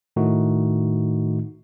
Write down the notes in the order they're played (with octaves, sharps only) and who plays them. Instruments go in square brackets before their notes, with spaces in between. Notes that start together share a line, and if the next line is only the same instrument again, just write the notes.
[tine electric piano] A2 D#3 A3 D#4 F#4